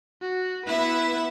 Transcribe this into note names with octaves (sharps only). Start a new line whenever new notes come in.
F#4
B3 E4 B4 E5